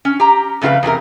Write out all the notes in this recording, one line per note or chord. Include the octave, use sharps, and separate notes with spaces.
C#4
G4 A#5
F2 C#3 A3 F4 B4 F5
E2 C3 F4 A#4